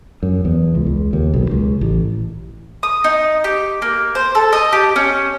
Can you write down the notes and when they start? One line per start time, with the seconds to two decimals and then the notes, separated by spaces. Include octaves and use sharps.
0.23 F#2
0.45 E2
0.75 C#2
0.86 C#2
1.13 D#2
1.34 B1
1.51 C#2
1.81 A1
2.83 D#6
3.04 D#4
3.44 G4
3.82 A#3
4.15 C5
4.35 A4
4.53 D#5
4.73 G4
4.96 C#4